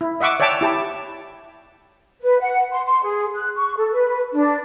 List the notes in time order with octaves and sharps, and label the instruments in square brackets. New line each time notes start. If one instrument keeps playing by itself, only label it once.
[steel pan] E4
D#5 E5 F#5 C#6 D6
C#5 D5 E5 G5 A5 D6
E4 G4 A5
[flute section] B4
F#5
C6
C6
G#4
F#6
C#6
A4
B4
D4